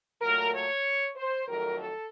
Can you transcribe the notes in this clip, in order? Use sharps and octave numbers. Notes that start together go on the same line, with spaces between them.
A#2 F#3 A3 A#4
C#5
C5
F2 D#3 F#3 A3 A#4
A4